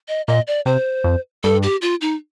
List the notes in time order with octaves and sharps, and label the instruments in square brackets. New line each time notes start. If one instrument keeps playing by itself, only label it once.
[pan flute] D#5
[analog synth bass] A#2 [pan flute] D#5
[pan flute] D5
[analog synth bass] C3 [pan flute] C5
[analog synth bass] F2
[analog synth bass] G2 [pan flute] A4
[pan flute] G4
F4
D#4